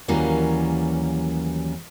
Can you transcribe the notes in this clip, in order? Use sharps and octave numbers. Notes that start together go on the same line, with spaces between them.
D#2 E3 F#3 G3 A#3 C#4